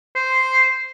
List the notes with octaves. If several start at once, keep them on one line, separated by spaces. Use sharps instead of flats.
C5